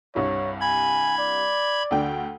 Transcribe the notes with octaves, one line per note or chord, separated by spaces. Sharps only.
C2 G2 E4 C#5
G#5 B5 G#6
D5
D2 D3 G5